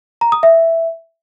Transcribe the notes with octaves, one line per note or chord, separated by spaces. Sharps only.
A#5
D#6
E5